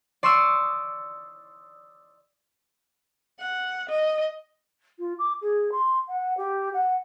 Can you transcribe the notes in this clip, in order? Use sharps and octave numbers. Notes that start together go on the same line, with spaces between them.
D5 C6 C#6 D#6 E6
F#5
D#5
F4
D6
G#4
C6
F#5
G4
F#5